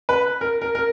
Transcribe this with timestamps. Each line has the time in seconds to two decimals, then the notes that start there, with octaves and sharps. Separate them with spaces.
0.09 B4
0.41 A#4
0.61 A#4
0.75 A#4